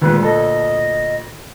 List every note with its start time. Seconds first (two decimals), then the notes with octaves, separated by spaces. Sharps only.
0.01 D2 A#2 D#3 G#3 B4
0.23 A4 D#5